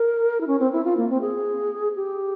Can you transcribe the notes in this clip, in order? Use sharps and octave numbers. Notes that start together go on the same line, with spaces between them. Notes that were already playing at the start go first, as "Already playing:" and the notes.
Already playing: A#4
E4
C#4
C4
E4
F4
A#3
C4
G#4
G4